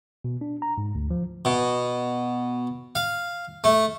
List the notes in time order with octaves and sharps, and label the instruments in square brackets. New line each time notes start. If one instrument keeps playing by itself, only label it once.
[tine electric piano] B2
D4
A#5
G#2
D2
F3
[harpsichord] B2
F5
A3